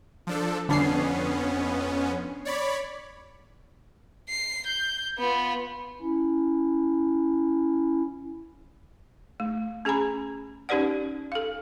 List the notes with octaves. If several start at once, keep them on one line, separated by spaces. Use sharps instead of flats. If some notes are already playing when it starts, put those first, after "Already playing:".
F3 D4 A4
G1 F2 B3 C#4 D4 C7
C#5 D5 B5
C7
G6
B3 F4
C#4 E4
A3
C#4 G#4 G#5 A#5 B5
C#4 D#4 G4 B4 D5 F#5
A4 F5